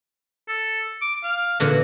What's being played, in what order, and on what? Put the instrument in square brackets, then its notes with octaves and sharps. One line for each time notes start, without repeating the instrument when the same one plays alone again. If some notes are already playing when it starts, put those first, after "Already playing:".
[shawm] A4
D6
F5
[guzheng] A#2 D3 E3 [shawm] F#4